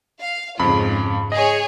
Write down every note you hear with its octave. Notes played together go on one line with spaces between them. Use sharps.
F5
F2 G#2 C#3 F4 B5
G#4 C#5 D#5